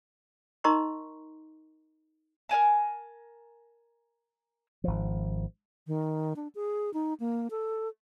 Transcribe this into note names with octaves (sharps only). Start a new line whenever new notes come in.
D#4 A#4 D#5 A#5 C6 C#6
A#4 D5 G#5 A5
G#1 F3
D#3
D4
G#4
D#4
A#3
A4